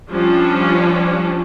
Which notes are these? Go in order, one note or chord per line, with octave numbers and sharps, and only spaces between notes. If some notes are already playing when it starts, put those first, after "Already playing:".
F3 G3 C#4 D4